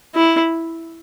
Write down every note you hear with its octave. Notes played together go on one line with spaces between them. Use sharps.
E4